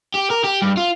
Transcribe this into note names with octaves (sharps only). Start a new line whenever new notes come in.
G4
A#4
G4
G2
F4